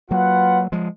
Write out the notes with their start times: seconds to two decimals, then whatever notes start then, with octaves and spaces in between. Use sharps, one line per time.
0.10 F#3 A#3 F4 B4 F#5
0.72 F3 G#3